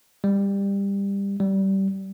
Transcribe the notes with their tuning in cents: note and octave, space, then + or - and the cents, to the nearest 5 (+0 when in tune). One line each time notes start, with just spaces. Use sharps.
G3 +20
G3 -20